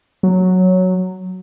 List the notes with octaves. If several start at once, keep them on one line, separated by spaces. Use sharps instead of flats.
F#3